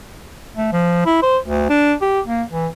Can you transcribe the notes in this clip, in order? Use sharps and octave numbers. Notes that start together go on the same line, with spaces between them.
A3
F3
E4
C5
D2
D4
G4
A#3
E3